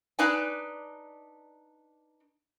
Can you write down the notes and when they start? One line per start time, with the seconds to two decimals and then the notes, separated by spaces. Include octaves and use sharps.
0.19 D4 D#4 B4 D5 G#5